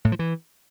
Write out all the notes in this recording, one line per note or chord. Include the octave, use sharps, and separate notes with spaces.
A2
F3
E3